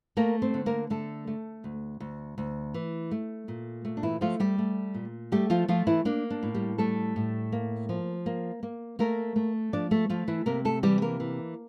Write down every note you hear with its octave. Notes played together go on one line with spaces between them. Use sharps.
A3 A#3 A#4
C4 C5
D3
A#3 A#4
D3 A3 A4
A3
D2
D2
D2
E3
A3
A#2
A3
D4
E3 E4
F3 A3 F4
G3 G4
A3
A#2
G3 A3 G4
F3 F4
F3 A3 F4
E3 E4
A#3 D4
D4
A2
G3 G4
G3 A3 A4
A2
A#3
F3
A#3
A#3
A3 A#3 A#4
A3
F3 D4 D5
A3 A4
F3 A3 F4
E3 E4
C3 A#3 A#4
A3 A4
E3 G3 G4
A#3 A#4
E3